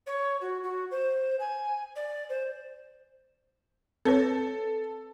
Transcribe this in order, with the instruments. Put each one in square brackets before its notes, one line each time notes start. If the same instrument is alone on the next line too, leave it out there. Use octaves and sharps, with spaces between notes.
[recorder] C#5
F#4
F#4
C5
G#5
D5
C5
[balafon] C4 B4 C#5 [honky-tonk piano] A4